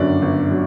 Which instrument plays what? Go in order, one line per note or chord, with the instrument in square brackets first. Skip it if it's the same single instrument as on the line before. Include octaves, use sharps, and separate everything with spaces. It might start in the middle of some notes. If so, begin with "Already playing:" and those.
Already playing: [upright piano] G1 F#2 D3 F#3 D5
G1
D3 F#3